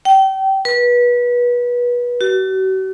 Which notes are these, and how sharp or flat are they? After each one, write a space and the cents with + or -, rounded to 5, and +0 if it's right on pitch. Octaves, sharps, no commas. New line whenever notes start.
G5 -30
B4 -25
F#4 +45